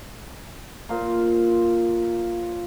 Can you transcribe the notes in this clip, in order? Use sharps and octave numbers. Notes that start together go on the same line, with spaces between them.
A#2 F4 C5 A#5